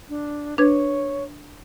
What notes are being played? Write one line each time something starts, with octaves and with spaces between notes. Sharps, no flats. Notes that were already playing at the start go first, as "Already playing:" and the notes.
D4
D4 B4 C#5 G#6